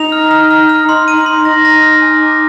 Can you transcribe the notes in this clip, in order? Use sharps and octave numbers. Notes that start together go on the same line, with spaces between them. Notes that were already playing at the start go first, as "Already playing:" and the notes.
Already playing: D#4 F7
F6
F6
F6
F6
D#4 C6
D#7
D#4
C6
D#4 A#6
A#6
F6
G#5
D6